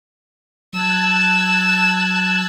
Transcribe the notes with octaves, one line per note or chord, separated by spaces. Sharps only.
F#3 A5 E6 F#6 G#6